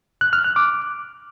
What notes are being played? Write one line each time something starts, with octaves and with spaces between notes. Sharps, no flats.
F#6
F6
F#6
D6